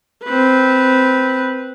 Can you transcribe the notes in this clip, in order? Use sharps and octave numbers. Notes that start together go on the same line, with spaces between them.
C4 B4